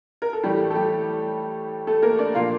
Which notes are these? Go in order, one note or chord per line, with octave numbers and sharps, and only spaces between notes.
A#4
A4
A2 E3 G3 A3 G4
A4
G3 G4
A3 A4
A#3 A#4
D4 D5
A#2 F3 A#3 F4 F5